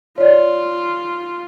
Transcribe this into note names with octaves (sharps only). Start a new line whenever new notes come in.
F4 C#5 D5